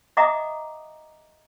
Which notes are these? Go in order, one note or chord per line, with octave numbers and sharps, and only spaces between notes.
D#5 E5 F#5 A#5 D6 D#6